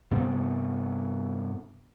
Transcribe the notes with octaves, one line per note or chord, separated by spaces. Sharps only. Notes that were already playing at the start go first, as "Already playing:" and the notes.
G2 C3 B3 C4